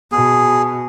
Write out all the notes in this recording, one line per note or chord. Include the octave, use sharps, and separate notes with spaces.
B2 G#4